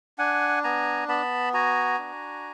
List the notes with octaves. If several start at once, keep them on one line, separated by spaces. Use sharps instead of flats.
D4 F#5 G#5
B3 G#5 A#5
B3 A5 B5
F#4 G#5 A#5
D4